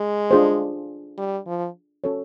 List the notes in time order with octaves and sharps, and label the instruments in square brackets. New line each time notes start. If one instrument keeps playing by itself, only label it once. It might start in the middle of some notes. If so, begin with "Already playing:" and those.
Already playing: [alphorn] G#3
[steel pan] D4 F4 G#4 C5
[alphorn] G3
F3
[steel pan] C#4 F#4 A4 C#5